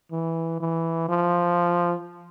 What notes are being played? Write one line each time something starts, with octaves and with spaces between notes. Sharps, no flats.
E3
E3
F3